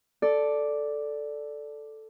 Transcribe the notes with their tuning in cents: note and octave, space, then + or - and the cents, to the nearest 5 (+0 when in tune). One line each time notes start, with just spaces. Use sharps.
A4 +0 D5 +0